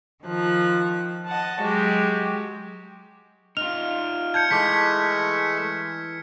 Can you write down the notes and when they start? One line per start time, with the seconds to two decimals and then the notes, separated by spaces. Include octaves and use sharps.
0.23 D#3 F3 F#6
1.27 D#5 F#5 A5
1.61 F#3 G#3 F#4 G4
3.57 D#4 F4 F6 F7
4.34 A5 G6 G#6 C#7
4.51 E3 G#3 A3 E5 A5 D6 B6